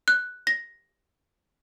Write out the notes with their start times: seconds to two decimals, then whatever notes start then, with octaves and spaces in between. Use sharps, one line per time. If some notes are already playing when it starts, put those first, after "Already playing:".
0.08 F#6
0.47 A#6